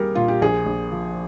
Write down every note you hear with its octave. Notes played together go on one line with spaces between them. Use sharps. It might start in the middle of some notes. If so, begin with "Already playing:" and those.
Already playing: C2 G3 A#3 G4 G#4 A#4
A#2 F4
G4
A#1 G#4
A#1
F3